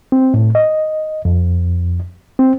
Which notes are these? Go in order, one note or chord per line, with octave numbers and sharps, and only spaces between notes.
C4
A2
D#5
F2
C4